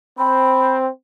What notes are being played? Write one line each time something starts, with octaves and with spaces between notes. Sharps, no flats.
C4 B5